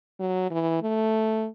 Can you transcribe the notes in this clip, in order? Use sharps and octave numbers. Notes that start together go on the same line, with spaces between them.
F#3
E3
A3